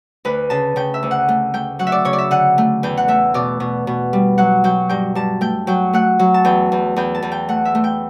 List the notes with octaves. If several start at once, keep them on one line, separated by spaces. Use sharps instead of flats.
D2 B4
C#3 A5
C#3 G5
E5
D2
F#5
A3
A3 G5
F#3 F#5
E5
D5
C#3 C#5
D5
E5
D3 F#5
A3
E2 G5
F#5
A3 E5
B2 D5
B2
B2
G3
F#3 F#5
F#3 G5
G2 G5
G2 A5
A3 G5
F#3 G5
A3 F#5
F#3
A5
E2 G5
E2
E2 G5
A5
E2
G5
A3 F#5
E5
A3
G5